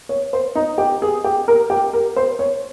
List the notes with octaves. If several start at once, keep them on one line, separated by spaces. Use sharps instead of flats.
C#5
C5
D#4
G4
G#4
G4
A#4
G4
A#4
C5
C#5